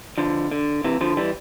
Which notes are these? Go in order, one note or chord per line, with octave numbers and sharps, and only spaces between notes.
D3 F3
D3
C3 E3
D3 F3
E3 G3